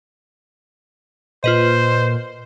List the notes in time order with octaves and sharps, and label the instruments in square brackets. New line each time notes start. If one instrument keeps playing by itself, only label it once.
[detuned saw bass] A#2 [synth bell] F4 B4 D#5 [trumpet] C5